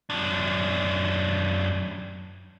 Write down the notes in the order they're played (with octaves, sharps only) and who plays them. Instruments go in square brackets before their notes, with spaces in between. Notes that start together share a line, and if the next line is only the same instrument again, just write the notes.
[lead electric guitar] F#2 D4